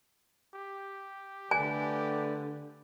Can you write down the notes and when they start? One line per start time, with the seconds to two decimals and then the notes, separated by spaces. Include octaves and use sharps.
0.54 G4
1.51 D3 A3 B4 D5 G#5